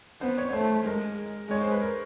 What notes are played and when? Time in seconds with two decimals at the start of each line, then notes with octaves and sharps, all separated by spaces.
0.21 B3 C5
0.38 C#5
0.49 C#5
0.53 A3 C5
0.86 G#3 A#4
1.49 G#3 C#5
1.61 C5
1.72 B4
1.81 A#4